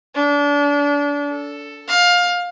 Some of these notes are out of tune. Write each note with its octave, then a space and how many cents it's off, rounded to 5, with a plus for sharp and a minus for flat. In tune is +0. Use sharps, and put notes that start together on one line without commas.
D4 -30
A4 +5
F5 +20